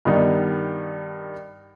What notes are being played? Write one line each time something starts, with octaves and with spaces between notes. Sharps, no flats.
G2 D#3 G3 B3 D#4